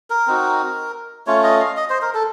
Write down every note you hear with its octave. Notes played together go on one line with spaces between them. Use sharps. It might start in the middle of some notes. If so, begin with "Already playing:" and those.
A#4
C4 D#4 F#4
A3 C#4 F4 C#5
D#5
F5
D#5
C5
A#4
A4